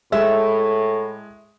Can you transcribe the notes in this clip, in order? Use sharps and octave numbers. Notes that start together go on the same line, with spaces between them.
A2 G#3 E5